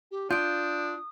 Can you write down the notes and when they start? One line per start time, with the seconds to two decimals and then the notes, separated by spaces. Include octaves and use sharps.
0.11 G4
0.31 D4 F4 D#6 G6 D7